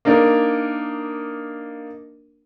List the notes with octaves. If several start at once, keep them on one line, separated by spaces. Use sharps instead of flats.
A#3 D4 D#4 A#4